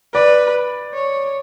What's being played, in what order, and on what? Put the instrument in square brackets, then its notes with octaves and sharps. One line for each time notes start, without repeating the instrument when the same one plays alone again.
[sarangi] B4 [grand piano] D5
[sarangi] C#5